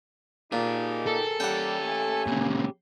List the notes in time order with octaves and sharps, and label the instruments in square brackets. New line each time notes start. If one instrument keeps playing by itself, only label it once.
[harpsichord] A#2 [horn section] D#4 G4 [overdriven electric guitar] G#4 A#4
[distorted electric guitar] A4
[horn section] G3 A#3 [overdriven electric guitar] C#4 G4 [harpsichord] F#5 G5
[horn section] A3 A#3 G#5
[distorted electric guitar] A#2 C#3